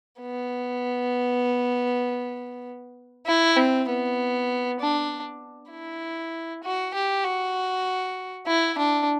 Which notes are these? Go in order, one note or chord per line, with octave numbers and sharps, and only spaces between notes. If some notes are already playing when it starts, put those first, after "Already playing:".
B3
E4
C4
B3
D4
E4
F#4
G4
F#4
E4
D4